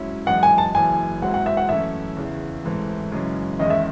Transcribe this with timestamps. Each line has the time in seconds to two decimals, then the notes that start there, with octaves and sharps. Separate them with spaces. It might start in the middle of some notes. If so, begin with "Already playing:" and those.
Already playing: G#2 F#3 C#4 E4
0.27 F#2 E3 G#3 D#4 F#5
0.43 G#5
0.58 A5
0.74 F#1 F#2 E3 G#5
1.22 G#2 F#3 C4 E4 F#5
1.34 F#5
1.46 E5
1.57 F#5
1.69 F#2 E3 A3 C#4 E4 E5
2.17 E2 C#3 E3
2.64 A1 G#2 E3 A3 C4
3.12 F#2 C#3 E3 G#3 C#4
3.59 E2 D#3 G#3 C#4 E4 D#5
3.70 E5